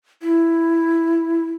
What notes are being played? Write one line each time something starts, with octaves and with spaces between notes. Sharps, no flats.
E4